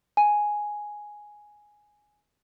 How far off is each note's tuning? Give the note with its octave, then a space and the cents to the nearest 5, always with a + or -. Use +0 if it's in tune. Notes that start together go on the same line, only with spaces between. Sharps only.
G#5 +5